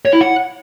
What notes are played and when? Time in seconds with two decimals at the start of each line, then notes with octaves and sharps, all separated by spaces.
0.05 C#5
0.13 E4
0.21 F#5